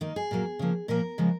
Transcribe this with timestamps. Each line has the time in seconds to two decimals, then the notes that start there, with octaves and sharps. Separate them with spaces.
0.01 D#3 A#3 D#4
0.16 G#4
0.31 A#2 F#3 A#3
0.59 C#3 F3 A#3
0.88 A#2 F3 A#3 A#4
1.18 C#3 F3 G#3